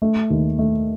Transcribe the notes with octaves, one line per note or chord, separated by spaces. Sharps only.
A3
D#2
A3